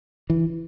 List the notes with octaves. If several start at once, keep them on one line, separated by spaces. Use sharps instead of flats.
E3